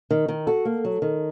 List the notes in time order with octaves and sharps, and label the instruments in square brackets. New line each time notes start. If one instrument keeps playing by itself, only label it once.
[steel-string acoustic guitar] D#3
D#3
[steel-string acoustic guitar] F#4 [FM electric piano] A4
[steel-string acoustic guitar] A#3
F#3
D#3